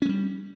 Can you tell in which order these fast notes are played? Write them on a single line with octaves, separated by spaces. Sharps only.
C#4 G#3 G3